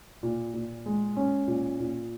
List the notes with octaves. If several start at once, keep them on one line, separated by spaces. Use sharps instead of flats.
A#2
A#2
G#3
C#4
A#2
A#2